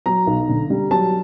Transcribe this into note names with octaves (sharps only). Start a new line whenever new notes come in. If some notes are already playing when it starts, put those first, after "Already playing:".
F#3 A#5
B1
D3
G3
F#3 A5